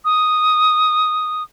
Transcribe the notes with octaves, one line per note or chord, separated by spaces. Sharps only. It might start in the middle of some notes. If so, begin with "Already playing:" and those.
D#6